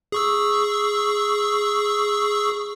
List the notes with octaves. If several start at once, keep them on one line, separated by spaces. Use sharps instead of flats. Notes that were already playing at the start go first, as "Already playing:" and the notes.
G#4 C#6 E6